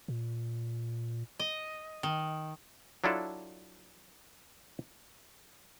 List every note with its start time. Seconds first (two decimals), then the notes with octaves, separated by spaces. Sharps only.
0.08 A#2
1.40 D#5
2.03 D#3
3.04 F#3 D4 E4 F4 A4